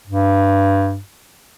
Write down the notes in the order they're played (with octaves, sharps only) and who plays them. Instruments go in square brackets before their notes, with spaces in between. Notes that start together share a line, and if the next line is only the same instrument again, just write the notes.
[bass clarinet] G2